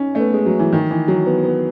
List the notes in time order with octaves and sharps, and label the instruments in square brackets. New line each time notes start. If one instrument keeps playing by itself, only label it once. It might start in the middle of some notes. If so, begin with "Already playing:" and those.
Already playing: [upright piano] C#4 D#4
A3
B3
G#3
F#3
E3
D#3
E3
F#3
B3
B3